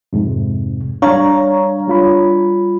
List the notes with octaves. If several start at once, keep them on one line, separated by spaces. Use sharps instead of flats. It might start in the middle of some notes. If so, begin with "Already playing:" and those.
F2 G#2 C3
G3 D4 C#5 F5 A#5
G3 F4 B5